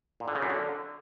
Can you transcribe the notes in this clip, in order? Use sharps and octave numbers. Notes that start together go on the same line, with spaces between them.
A#2
D3
C#3
F#2
D3